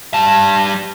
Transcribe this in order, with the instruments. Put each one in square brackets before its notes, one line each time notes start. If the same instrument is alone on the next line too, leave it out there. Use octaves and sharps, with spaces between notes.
[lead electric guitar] G3 A5